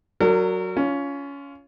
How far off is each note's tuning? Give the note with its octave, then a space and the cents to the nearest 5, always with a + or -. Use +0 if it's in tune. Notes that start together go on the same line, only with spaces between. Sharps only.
F#3 +0 A#4 -35 D5 -20
C#4 +20 F4 -5